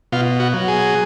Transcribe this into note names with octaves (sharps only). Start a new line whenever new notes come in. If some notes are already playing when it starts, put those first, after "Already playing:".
B2 F4
F#4
F#3
G#4